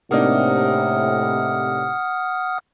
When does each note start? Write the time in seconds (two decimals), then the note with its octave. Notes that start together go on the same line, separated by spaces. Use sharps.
0.11 A2 C3 A#3 D4 D#4 F#5 D#6 F6